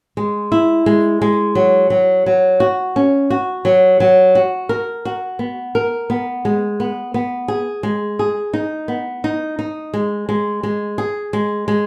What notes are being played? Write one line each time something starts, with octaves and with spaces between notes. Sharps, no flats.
G#3
E4
G#3
G#3
F#3
F#3
F#3
F#4
C#4
F#4
F#3
F#3
F#4
A#4
F#4
B3
A#4
B3
G#3
B3
B3
G#4
G#3
G#4
D#4
B3
D#4
D#4
G#3
G#3
G#3
G#4
G#3
G#3